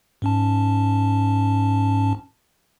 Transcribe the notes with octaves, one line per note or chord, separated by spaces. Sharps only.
G#2 C#4 A5